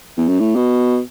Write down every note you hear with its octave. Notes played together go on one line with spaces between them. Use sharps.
E2
F#2
A2
B2